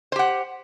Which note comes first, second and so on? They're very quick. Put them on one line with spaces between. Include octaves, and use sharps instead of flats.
C5 G4 F#5